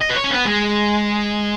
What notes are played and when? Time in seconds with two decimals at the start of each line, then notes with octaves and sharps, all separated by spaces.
0.01 D#5
0.10 B4
0.16 C#5
0.24 C#4
0.30 B3
0.45 G#3